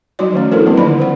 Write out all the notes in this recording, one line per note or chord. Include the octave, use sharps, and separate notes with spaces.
F#3 G3 D#4 F#4 D5
D#3 F3 A3 C#4
D4 E4 A4 A#4 C5
F#3 G3 A#3 C4 E4 B4
D3 D#3 D#4 F4 D5 B5
C5 F#5